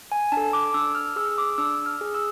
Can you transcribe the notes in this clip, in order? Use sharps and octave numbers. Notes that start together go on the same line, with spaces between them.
G#5
D4 A5
A4
D6
D4 E6
F6
G#4 E6
D6
D4 E6
F6
G#4
E6